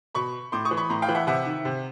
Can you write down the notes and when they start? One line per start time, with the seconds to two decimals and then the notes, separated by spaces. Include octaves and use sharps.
0.15 B2 B5 C#6
0.52 A2 C6 D6
0.65 C#6 D#6
0.71 E3
0.77 B5 C#6
0.90 A2 A#5 C6
1.02 F5 G5
1.08 E3
1.15 E5 F#5
1.27 C3 E5 F#5
1.46 D#3
1.65 C3